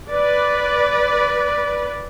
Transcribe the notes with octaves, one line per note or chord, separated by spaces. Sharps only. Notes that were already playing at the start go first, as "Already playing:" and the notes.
B4 D5